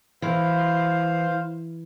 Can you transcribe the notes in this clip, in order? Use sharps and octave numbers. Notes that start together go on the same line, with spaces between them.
E3 C5 F5